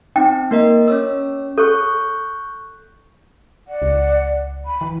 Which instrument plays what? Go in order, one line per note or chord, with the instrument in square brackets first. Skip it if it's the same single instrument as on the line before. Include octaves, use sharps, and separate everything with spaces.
[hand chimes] C4 D#4 [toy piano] G5
[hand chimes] A#3 A#4 D#5
C#4 C#5 E6
[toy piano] A4 [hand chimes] C#6 F#6 G6
[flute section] D5 F#5
[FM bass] C#2
[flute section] B5
[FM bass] E3